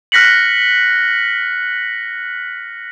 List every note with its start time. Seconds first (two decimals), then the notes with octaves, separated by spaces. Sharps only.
0.12 F6 F#6 A#6 B6 C#7 F#7